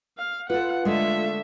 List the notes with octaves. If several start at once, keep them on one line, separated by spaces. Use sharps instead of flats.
F5
F4 A4 B4 F#5
D3 G#3 A3 E5